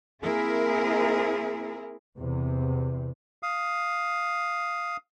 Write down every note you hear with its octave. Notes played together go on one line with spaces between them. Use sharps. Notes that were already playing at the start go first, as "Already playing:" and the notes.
A#3 C4 E4 G#4 A#4
E2 C3
F5 D#6